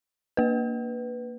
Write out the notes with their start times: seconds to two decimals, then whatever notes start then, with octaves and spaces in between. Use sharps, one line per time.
0.37 A#3 B4